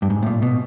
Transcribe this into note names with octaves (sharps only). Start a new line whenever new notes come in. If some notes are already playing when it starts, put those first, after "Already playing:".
G2
G#2
A2
A#2
B2